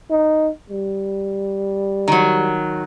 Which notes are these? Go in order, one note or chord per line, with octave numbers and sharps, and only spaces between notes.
D#4
G3
D#3 F#3